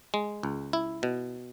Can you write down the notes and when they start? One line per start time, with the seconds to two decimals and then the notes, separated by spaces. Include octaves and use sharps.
0.14 G#3
0.43 C#2
0.73 E4
1.03 B2